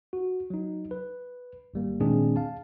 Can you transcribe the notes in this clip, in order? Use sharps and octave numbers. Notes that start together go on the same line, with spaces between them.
F#4
F#3 D#4
B4
G#1 G3 A#3
A#2 D#3 G#3 C4 D4 G#4
F5 A5